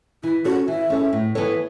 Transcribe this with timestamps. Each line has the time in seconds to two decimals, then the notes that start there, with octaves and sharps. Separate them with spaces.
0.23 E3 E4
0.45 C#4 F#4 A4 C#5
0.68 E3 E5
0.90 C#4 A4 C#5
1.13 A2
1.35 E3 B3 A4 C#5